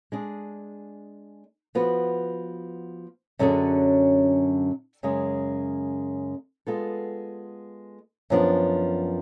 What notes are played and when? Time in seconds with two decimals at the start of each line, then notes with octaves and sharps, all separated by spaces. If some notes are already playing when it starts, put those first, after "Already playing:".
0.12 G#3 D4 G#4
1.75 F3 B3 F#4 B4
3.39 F#2 D3 F#3 C#4 G#4
5.03 F#2 C#3 G#3
6.67 G#3 B3 F4 A4
8.30 F#2 F3 B3 D4